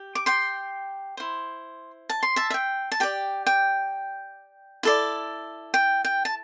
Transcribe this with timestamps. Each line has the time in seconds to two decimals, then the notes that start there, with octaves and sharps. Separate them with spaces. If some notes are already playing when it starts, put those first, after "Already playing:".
Already playing: G4
0.15 D6
0.26 G5 C6
1.17 E4 C5
2.10 A5
2.23 C6
2.36 E5 A5
2.50 E5
2.54 G5
2.92 A5
3.00 G4 D5 G5
3.47 G5
4.83 E4 A4 D5
5.74 G5
6.05 G5
6.25 A5